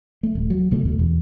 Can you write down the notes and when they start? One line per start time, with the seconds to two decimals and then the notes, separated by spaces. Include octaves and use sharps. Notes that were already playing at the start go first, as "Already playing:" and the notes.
0.23 A3
0.35 D#1
0.50 F#3
0.71 C#2 B2 A3
0.85 D#2 B2
0.99 E2